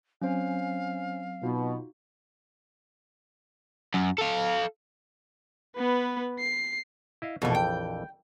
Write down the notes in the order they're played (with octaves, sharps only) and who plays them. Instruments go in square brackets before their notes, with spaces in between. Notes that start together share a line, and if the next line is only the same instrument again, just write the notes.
[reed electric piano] F#3 C4 [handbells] C#4 C5 G#5 [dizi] F5
[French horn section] B2 [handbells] D#4 F4 F#4
[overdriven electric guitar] F#2
A4 F5
[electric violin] B3 B4
C7
[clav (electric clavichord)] E4 D#5 F5
[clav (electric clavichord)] A#1 F2 E3 [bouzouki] B2 A3
[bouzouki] G5